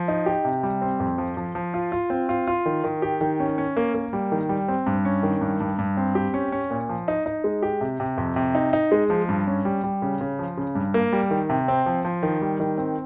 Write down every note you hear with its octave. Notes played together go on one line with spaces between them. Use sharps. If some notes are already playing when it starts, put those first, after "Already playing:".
Already playing: F3
D#4
G4
C3
G3
C4
F2
F3
F3
F3
F4
F4
C4
F4
F4
D#3
D#3
G4
D#3
C#4
C#4
A#3
A#3
G3
D#3
G3
C4
G2
C#4
D#3
G2
G2
G2
C4
G4
C#4
C#4
A#2
F3
D#4
D#4
G#3
G4
C3
C3
F2
C3
D#4
D#4
G#3
F3
G2
C#4
G3
G3
C#3
C#3
F3
C#3
G2
A#3
G3
D#3
C3
C4
F3
F3
D#3
G3
D#3
C4